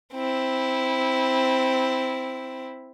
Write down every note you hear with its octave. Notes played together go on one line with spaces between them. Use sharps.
C4 E4